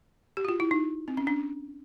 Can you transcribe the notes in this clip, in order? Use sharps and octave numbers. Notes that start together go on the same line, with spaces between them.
G4
F#4
F4
E4
D#4
C4
C#4
D4